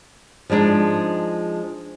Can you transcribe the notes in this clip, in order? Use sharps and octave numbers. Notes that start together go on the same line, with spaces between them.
F3 G3 G#3 D4 D#4